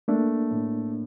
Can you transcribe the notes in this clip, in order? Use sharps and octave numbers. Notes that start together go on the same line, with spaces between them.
A3 A#3 D4
A2